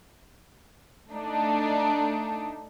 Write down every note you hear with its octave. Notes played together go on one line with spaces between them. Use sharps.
A3 D4 D#4